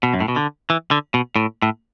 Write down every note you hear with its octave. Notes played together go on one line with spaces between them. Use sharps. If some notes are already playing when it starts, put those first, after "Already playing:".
B2
F#2
A2
B2
D3
E3
D3
B2
A2
A2